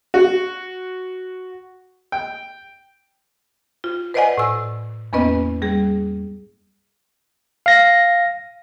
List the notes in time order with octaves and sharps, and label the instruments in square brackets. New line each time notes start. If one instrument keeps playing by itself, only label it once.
[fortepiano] F#4
G5
[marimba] F4
B4 C5 D5 D#5 F#5 G#5
A2 E6
E2 A#3 B3 C#4 B4 D#5
G3 G#4
[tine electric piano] F5 A#6